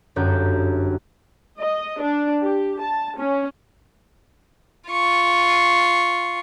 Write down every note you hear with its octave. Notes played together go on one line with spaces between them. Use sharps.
G1 F#2 G6
D#5
D4
G4
A5
C#4
F4 C#6